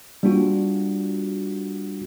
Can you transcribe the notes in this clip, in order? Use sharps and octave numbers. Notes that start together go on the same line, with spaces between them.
G3 A#3 D4 F4 F#4